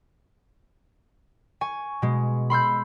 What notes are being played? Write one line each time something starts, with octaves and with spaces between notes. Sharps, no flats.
G#5 C#6
B2 G#3
B5 C6 E6 G6